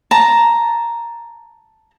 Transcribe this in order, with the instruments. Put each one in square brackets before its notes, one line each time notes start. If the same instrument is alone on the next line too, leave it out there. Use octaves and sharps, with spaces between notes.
[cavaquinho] A5 A#5